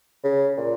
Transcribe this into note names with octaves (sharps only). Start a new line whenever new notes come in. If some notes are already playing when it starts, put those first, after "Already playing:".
C#3
A#2